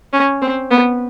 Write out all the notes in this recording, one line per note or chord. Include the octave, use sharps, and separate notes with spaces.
C#4
C4
B3